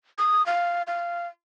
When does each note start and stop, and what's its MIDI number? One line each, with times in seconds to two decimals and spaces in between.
0.18 0.45 87
0.46 0.83 77
0.87 1.27 77